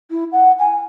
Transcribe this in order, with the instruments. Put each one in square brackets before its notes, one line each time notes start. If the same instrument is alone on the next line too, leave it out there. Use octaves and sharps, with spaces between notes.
[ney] E4
F#5
G#5